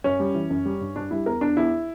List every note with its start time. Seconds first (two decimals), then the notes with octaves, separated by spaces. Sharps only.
0.04 F#2 C#4
0.20 G3
0.34 E3
0.50 F#2
0.65 G3
0.80 G2
0.96 G2 D4
1.11 G3 E4
1.26 E2 A#4
1.41 E2 D4
1.57 E2 E4